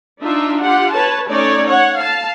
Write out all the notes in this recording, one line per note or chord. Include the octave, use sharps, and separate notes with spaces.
D4 D#4 F4 E5
F4 G4 F#5
B4 C#5 A5
A3 C#4 D#4 C#5 D5
C#5 F#5
F5 A5